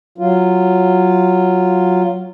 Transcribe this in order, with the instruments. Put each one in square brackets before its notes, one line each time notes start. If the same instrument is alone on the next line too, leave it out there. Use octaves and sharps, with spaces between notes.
[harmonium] F#3 F4